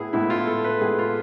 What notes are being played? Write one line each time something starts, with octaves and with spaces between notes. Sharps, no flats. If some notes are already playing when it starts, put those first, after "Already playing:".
Already playing: A2 B3 E4 G#4
A2 G#3 B3 E4
F4
A4
B4
A2 G#3 B3 G#4
F4